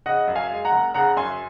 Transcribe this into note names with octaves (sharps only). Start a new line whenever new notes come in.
C#3 D#5 F#5
F#2
F5 G#5
G#3
F#5 A#5
F#1
C#3 F#5 A#5
F#2 G#5 C6